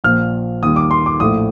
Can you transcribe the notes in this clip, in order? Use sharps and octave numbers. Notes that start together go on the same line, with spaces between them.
A#1 A#2 F3 F6
D#2 D#3 G3 D#6
D6
C6
D6
A#1 A2 F3 A3 D#6